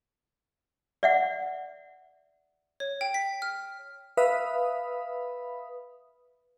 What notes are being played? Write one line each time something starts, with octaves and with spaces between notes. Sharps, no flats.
D5 E5 F#5
C#5
G5
B6
F6
B4 E5 F5 B5 D#6